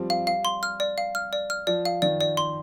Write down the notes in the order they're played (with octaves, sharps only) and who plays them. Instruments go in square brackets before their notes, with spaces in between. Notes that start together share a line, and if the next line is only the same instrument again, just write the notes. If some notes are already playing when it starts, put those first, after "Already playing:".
Already playing: [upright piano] F3 G3 C4
[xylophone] F5
F5
C6
F6
D5
F5
F6
D5
F6
[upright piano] F3 [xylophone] D5
[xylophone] F5
[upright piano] D#3 [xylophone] D5
[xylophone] D5
C6